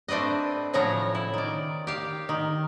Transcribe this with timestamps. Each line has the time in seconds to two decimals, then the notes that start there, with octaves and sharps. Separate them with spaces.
0.08 A3 C4 D4 B4 D#5
0.73 A2 C#3 F3 F#3 C#5 A#5
1.15 E4
1.34 D#3 D5
1.87 G4 F5
2.29 D#3